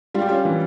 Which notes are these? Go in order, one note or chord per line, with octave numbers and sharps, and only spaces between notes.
G3 F4
G4
C#4 F4
E3